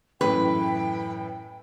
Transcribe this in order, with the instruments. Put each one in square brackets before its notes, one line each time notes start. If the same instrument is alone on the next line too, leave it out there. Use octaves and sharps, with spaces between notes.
[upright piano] F#2 A2 E3 [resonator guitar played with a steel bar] B4 [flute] G5